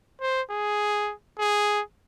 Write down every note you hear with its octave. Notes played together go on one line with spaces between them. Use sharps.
C5
G#4
G#4